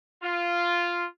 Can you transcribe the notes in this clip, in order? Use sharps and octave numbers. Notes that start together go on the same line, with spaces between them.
F4